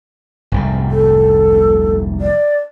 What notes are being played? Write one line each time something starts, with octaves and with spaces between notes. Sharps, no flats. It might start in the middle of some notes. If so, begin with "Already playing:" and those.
F1 C2 G#2
A4
D5